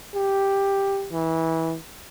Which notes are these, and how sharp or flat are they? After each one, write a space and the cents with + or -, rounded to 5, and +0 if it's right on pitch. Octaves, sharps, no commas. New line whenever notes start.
G4 +5
E3 -20